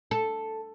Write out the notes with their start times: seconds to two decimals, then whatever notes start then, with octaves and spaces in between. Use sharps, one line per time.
0.11 A4